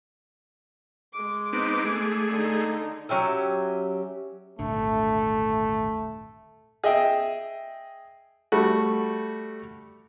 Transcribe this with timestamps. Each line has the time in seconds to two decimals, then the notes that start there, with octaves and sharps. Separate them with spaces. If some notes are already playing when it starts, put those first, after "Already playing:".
1.13 G#3 D6
1.53 B3 C4 D#4
1.85 A3 G#4
2.30 D3 D#4
3.09 F#3 C#4 G4 E5
4.59 D#1 G#1 D3 A3
6.84 G#4 D#5 E5 G5
8.52 G3 A3 F#4